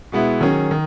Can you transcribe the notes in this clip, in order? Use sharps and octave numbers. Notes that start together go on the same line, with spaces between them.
B2 G#3 B3 E4
D#3 F#3 C#4 G#4
D#3